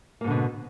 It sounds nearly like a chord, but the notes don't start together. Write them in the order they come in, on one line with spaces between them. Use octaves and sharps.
A#3 G#2 D3 B2